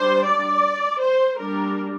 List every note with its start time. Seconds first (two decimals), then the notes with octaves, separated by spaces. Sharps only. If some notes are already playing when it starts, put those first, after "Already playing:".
Already playing: G3 D4 C5
0.25 D5
1.00 C5
1.39 G3 A#3 D4 A#4